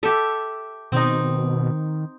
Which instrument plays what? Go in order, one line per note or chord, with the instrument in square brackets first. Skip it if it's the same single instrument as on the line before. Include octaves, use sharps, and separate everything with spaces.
[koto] G4 E5 [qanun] A4
[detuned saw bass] B2 [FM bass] D#3 [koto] C4 D#4